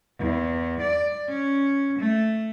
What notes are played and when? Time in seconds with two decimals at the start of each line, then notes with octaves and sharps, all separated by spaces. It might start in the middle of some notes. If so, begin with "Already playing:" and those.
0.19 E2
0.81 D5
1.28 C#4
1.99 A3